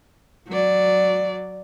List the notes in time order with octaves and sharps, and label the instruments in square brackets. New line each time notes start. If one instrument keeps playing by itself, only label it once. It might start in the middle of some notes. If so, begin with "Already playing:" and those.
[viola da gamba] F#3 D5